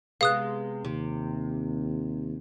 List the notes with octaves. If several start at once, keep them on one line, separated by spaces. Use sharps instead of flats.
C3 G#3 B3 F5 D#6 F#6
D#2 C3